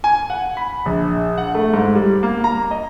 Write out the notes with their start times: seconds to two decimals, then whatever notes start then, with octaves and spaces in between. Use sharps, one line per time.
0.04 G#5
0.30 F#5
0.57 B5
0.86 A#1
1.38 F#5
1.55 A3
1.74 G#2
1.95 G3
2.23 A#3
2.44 A#5
2.71 D#5